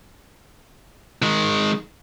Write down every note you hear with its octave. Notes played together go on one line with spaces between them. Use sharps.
D#3 G#3